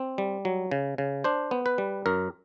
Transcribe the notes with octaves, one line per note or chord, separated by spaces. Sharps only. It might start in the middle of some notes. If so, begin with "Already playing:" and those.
Already playing: C4
G3
F#3
C#3
C#3
D4 C5
B3
B4
G3
F#2 A#4